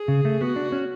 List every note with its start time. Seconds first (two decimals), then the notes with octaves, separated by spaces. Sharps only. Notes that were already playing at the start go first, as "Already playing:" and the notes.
Already playing: G#4
0.08 C#3
0.25 A3
0.41 B3 F#4
0.56 D4
0.72 C#4